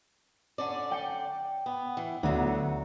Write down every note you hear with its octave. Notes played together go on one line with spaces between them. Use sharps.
D3 C#4 D5
G5 C#7
B3
E3
D2 F#3 B3
C#7